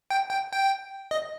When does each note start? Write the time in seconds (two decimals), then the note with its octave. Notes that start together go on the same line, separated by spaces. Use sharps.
0.10 G5
0.31 G5
0.52 G5
1.11 D#5